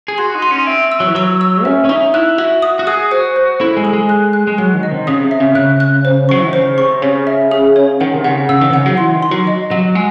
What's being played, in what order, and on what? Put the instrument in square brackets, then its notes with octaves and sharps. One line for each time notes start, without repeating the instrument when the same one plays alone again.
[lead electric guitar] G#4
[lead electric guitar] F#4 [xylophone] C6
[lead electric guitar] D#4
[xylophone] C6
[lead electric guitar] C#4
[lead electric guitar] C4 [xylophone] E5
[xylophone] E6
[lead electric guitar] F#3
E3
[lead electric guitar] F#3 [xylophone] E6
[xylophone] E6
[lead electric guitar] C#4 [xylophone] E5
[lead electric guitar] C#4
[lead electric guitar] D#4 [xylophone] E5
[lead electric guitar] E4 [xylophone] F#6
[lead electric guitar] F#4 [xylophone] E5
[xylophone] D#6
[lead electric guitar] F#4
[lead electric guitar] G#4 [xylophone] D#6
[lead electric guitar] F#4 [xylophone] C5
[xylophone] C5
[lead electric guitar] E4 [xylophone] A4
[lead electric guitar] G#3
[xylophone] A4
[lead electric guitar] G#3
[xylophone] F#6
F#6
[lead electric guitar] G#3
[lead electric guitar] F#3 [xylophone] F#6
[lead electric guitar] D#3
[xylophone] D#5
[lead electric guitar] C3
[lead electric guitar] C#3 [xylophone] D#6
[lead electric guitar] C3
[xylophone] E5
[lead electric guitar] C#3
[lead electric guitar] C#3 [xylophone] F#6
[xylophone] F#6
C5
[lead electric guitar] F#3 [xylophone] C#6
[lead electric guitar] E3
D#3
[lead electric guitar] C#3 [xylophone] C5
[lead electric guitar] C3 [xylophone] C#6
[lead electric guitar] C#3 [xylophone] C#5
[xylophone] E5
G#4
C#5
[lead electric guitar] D#3 [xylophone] F#5
[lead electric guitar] C3
[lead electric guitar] C#3 [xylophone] F#5
[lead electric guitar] C#3 [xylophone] E6
[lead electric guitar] D#3
C3
[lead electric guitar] C#3 [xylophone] F#5
[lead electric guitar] F#3
[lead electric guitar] E3 [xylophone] C6
[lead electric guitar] D#3
[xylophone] C6
[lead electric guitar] F#3
[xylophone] D#5
[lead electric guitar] F#3 [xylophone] D#5
[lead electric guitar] G#3